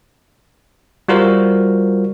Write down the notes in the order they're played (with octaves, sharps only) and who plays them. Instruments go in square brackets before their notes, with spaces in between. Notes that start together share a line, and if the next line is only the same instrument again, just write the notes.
[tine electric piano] G3 F4 F#4 A#4 C5